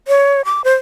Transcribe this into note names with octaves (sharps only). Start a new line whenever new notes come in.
C#5
D6
C5